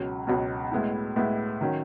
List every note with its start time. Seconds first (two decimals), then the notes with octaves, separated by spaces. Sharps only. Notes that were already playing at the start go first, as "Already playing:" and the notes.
Already playing: C#2 B2 F#3 C#4
0.27 C#2 B2 F#3 C#4
0.72 A2 G#3 B3 E4
1.16 A2 G#3 B3 E4
1.61 D#3 F#3 C#4